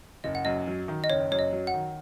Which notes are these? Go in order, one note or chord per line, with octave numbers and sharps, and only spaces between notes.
F#1 D#5
F#5
F#2 D#5
F#3
D#3
D#5
F#1 C#5
F#2 C#5
D#5
F#3
F#5
D#3